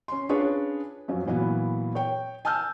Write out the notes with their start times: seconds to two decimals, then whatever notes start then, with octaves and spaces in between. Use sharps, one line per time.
0.08 C#4 C6
0.29 C#4 D4 F4 G#4 B4 C#5
1.08 F#2 F3 F#3
1.26 A#2 E3 F#3 B3
1.95 C#5 G5
2.45 G#5 A5 E6 F6 G6